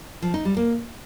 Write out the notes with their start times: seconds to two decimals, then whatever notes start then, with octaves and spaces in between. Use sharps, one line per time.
0.22 F3
0.34 D#4
0.45 G3
0.57 A#3